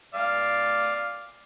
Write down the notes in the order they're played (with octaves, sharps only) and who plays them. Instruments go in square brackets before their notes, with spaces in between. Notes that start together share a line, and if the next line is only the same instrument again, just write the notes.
[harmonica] D5 F5